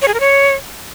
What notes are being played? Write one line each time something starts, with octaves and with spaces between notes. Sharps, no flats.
C#5
G#4
A#4
C#5